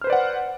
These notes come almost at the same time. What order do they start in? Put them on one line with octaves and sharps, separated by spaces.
F6 C5 B4 D5 F#5